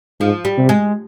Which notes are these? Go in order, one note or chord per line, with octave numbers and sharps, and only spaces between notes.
G#2 F3
G3
C3
G#3